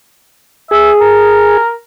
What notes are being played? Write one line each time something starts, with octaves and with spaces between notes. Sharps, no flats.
G#4 E5
A#4